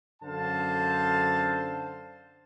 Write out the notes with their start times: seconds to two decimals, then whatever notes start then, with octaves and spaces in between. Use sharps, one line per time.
0.23 F#2 D3 A4 C5 F5 A5